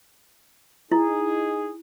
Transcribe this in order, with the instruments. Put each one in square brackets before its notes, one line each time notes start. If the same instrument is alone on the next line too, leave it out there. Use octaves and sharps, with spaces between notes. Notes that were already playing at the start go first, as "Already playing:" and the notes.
[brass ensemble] D#4 G#4 [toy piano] E4